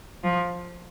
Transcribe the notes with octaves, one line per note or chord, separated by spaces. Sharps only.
F3